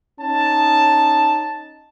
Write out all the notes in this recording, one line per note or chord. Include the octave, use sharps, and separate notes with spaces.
C#4 D#4 A5